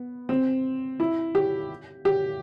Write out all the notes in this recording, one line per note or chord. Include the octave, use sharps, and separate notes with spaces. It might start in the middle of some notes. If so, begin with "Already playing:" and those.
Already playing: B3
C4
E4
G4
G4